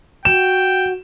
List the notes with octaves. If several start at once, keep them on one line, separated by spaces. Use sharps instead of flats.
F#4 G5 E7